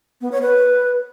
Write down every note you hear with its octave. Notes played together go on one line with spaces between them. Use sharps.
B3
C#5
B4